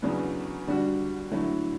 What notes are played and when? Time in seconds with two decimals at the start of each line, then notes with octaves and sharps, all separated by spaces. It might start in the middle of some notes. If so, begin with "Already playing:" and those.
0.02 E2 C#3 F#3 B3 D4
0.67 D3 G3 D4 F#4
1.31 D3 F#3 A3 E4